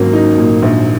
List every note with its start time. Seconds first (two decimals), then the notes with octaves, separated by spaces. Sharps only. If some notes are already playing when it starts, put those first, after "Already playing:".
Already playing: G#1 F#3 A#3 C#4
0.13 D#4
0.38 A#2
0.62 A#1